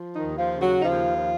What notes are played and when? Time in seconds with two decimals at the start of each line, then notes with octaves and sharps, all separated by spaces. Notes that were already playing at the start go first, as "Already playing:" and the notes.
Already playing: F3
0.15 D#3 D#4
0.22 D#2
0.38 F3 F4
0.54 C#3
0.62 F#3 F#4
0.80 D#4
0.84 D#2 F3 F4
1.16 F3